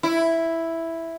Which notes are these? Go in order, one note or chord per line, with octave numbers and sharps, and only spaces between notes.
E4